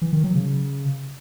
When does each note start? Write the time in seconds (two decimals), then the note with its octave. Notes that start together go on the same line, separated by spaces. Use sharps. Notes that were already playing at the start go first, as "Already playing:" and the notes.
0.02 E3
0.13 D#3
0.24 F#3
0.35 C#3